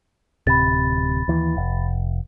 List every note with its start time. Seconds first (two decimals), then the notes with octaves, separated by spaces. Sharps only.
0.47 D1 C3 B5 A6
1.28 D#2 E3
1.57 F1